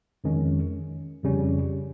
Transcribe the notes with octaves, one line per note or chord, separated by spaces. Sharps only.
F2 D#3 G#3 C#4
F2 C#3 G3 C#4